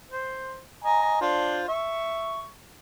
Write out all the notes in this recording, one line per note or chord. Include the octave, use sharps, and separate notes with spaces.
C5
D#5 G#5 A#5
D4 F4 C5
E5 C#6